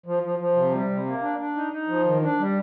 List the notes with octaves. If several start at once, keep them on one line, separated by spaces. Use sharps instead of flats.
F3
F3
F3
C3
G3
C3
A#3
D4
D4
D#4
D#4
F3
D#3
D4
G3